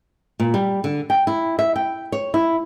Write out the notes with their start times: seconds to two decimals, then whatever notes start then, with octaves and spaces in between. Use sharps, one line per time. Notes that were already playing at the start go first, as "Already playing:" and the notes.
0.40 A#2
0.54 G3
0.84 D3
1.10 G5
1.27 E4
1.59 E5
1.76 G5
2.12 C#5
2.34 E4